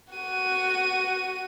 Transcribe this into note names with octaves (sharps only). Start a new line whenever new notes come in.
F#4 D#7